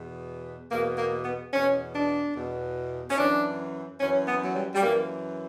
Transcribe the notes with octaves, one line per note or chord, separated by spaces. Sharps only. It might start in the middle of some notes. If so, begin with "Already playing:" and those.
Already playing: E2 B2
E2 B2 A#3
A#3
B3
E2 B2 C#4
D4
E2 B2
C#4
F#2 E3 D4
F#2 E3 C#4
B3
F#3
G3
G3
F#2 E3 A#3